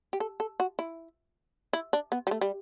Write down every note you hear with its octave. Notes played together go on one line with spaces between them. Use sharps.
G4
A4
A4
F#4
E4
E4
D4
B3
G3
A3
G3